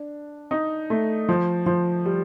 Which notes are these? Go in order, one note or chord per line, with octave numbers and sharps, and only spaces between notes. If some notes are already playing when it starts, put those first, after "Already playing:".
Already playing: D4
D#4
A3
F3
F3
G3